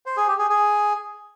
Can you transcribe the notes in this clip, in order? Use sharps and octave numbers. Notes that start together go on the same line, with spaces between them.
C5
G#4
G4
G#4
G#4